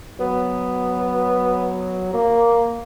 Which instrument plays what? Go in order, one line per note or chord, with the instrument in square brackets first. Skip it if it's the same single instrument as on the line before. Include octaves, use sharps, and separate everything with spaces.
[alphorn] F#3 [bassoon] B3
[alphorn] A#3